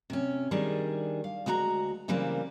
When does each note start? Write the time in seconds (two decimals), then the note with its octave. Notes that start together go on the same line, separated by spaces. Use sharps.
0.10 C3 C#4
0.51 D#3 G3 D4 G#4
1.24 F5
1.46 D2 G#3 F#4 D#5 A#5
2.08 C#3 E3 G3 A#3 C4